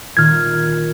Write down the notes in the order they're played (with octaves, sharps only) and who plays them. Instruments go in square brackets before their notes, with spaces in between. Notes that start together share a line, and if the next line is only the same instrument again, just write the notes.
[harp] A#2 D#3 [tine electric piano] F6 G#6